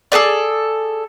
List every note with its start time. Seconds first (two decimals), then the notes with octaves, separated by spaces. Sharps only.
0.12 G#4 A4 B4 D5